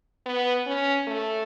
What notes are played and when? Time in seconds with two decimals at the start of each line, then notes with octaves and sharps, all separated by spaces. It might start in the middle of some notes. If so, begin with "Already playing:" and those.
0.26 B3
0.67 C#4
1.08 A3